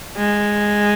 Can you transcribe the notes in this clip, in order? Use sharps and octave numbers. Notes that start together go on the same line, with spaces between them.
G#3